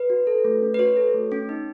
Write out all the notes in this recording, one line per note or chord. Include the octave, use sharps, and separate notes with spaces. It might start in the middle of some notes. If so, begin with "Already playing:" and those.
Already playing: B4
F#4
A4
A3
C#4
B4
F#4 C#5
A4
A3
C#4
D#4